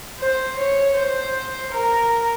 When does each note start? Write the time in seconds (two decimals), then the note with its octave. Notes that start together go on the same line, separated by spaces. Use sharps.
0.19 C5
0.57 C#5
0.96 C5
1.72 A#4